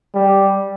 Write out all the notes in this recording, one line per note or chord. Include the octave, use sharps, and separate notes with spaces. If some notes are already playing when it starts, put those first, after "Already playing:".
G3